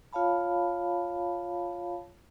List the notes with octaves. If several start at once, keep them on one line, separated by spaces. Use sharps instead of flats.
F4 C#5 F5 A5 B5